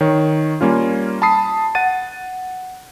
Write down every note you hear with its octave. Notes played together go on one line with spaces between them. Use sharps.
D#3 C#5
G3 A#3 C#4 F4
A5 B5 D#6 C7
F#5 A6 D#7